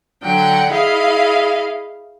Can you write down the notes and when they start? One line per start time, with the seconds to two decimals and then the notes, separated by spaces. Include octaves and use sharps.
0.24 D3 F#3 F#5 G5
0.71 E4 G#4 D#5 F5